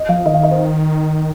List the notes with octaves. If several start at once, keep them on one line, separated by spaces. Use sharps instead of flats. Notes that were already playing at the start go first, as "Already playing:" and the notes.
Already playing: D#5
F3 F5
D#3 D#5
F5
D#5
C5